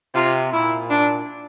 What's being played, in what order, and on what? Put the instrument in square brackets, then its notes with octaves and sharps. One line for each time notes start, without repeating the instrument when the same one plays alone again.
[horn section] C3 [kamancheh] F4
[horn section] A#2 [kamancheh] E4
[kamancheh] D4